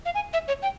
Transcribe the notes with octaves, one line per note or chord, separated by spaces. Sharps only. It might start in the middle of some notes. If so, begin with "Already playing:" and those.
F5
G#5
E5
C#5
G5